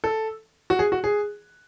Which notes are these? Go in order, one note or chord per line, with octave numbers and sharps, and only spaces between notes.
A4
F#4
G#4
F#4
G#4